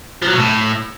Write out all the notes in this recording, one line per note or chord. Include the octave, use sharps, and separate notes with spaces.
F3
F#3
B2
A2